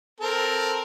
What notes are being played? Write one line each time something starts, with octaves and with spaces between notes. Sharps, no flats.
C4 A4 A#4